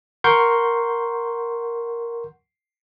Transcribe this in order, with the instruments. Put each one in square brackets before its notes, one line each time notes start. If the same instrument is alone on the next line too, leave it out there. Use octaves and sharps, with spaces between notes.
[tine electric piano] A#4 F#5 C6 C#6 G6